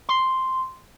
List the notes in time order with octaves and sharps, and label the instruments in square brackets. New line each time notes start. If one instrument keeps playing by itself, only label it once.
[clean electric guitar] C6